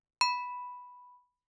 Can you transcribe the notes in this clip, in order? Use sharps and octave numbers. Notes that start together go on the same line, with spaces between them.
B5